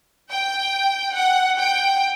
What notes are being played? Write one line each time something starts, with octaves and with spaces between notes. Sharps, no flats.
G5
F#5
G5